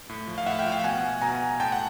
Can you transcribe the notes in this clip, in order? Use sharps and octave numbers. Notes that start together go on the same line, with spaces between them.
A2
F3
F5
A2 E5 F#5
F5 G5
F3
F5 G5
B2 F#5 G#5
B2 G#5 A#5
A2 G5 A5
F#5